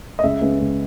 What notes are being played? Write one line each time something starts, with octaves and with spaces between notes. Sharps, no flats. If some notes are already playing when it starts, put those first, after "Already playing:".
D#5
C#2 E5
C#3 G#3 B3
C#2